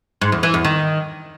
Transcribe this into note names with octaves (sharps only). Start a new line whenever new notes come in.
G#2
E2
E3
E2
D#3